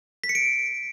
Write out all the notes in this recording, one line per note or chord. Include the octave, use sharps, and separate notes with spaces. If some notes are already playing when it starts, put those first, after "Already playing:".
B6
C#7
D7